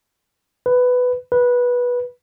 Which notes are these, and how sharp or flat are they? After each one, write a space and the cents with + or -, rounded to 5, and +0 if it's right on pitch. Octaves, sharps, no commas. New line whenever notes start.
B4 +10
B4 -15